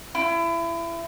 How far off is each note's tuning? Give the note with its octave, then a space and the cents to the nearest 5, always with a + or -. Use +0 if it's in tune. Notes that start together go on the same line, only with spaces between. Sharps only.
E4 +30